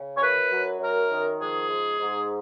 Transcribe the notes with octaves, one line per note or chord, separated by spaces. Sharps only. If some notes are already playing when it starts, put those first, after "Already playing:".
Already playing: C#3
C#5
F#2 B4
F#3
F#2 A#4
D#3
F3 G#4
G#2
G#2